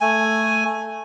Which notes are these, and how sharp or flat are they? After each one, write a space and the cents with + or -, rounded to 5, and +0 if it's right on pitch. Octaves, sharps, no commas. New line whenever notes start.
A3 +5 G#5 +0